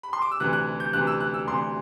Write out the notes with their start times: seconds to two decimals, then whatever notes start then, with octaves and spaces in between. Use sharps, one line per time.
0.03 B5
0.13 C6
0.22 D6
0.31 E6
0.40 D2 C3 E3 F#6
0.53 F#6
0.80 G6
0.93 D2 C3 E3 F#6
1.07 E6
1.20 F#6
1.34 E6
1.47 D2 C3 E3 C6